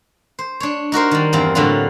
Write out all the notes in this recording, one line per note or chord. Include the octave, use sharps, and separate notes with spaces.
C5
D4 C#5
D#4 F#4 A#4 C5
D#3 G3
E2 G2 A#3 C4
A2 D3 F#3 G3 A#3 F4